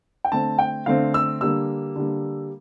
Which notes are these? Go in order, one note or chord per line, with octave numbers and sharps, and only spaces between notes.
G5
D3 A3 C4 A5
G5
D3 A3 C4 F5
E6
D3 G3 A#3 E6
D3 G3 A#3